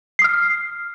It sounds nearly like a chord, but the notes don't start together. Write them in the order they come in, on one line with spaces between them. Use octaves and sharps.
C7 D#6 F6